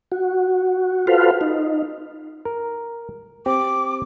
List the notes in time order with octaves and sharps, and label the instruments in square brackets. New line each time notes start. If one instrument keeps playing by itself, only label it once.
[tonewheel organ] F#4
F4 F#4 A4 B4 C5 F5
D#4
[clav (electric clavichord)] A#4
[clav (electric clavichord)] C4 G4 [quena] D6